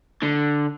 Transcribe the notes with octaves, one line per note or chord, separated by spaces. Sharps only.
D3